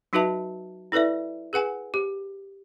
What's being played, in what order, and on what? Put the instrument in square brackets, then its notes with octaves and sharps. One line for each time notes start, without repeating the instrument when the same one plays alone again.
[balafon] F#3 D#4 F#4 B4 E5 A5
E4 A4 B4 D5 E5
G#4 B4 F#5 G#5
G4